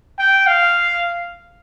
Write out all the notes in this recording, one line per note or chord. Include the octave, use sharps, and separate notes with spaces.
G5
F5